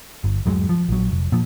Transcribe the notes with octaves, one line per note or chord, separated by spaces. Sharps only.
G1
D1 F#2 F#3 G#3
F3
A#1 F#3
F1
A#2 F3